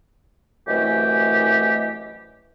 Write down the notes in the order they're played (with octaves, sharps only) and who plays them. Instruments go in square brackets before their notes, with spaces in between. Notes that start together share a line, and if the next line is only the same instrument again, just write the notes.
[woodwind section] C2 F#2 E3 A3 G4 D#5